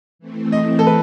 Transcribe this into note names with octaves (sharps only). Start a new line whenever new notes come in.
E3 A3 C4
D#5
A4
B4